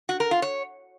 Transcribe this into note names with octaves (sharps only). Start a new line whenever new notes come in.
F#4
A#4
F4
C#5